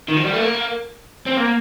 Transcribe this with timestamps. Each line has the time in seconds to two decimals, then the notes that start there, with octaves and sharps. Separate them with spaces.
0.08 D#3
0.17 F3
0.24 G3
0.33 A3
0.40 A#3
1.26 C4
1.37 A#3